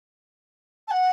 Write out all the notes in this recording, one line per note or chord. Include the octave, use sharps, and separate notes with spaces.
A5
F#5